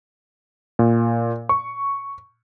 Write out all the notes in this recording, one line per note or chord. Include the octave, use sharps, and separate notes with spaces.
A#2
C#6